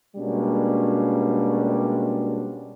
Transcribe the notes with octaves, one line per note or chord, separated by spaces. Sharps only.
B2 G3 G#3 A#3 C#4 D4